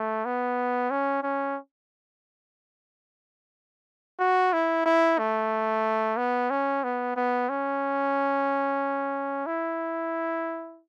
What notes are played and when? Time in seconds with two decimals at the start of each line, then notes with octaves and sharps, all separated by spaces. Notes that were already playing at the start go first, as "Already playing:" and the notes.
Already playing: A3
0.25 B3
0.91 C#4
1.24 C#4
4.20 F#4
4.53 E4
4.86 E4
5.19 A3
6.17 B3
6.51 C#4
6.84 B3
7.17 B3
7.49 C#4
9.46 E4